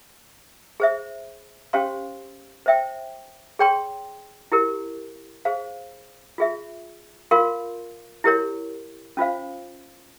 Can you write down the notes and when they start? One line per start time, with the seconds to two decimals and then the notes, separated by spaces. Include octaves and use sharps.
0.80 G#4 C5 E5
1.73 C#4 G4 C5 F5 C6
2.66 C5 E5 G5
3.59 G#4 C#5 G5 C6
4.52 E4 G4 A#4
5.45 G#4 C5 F5
6.38 F4 G#4 E5
7.31 F4 A#4 F5 C6
8.24 E4 G4 A#4 C#5
9.17 C#4 F4 C5 F5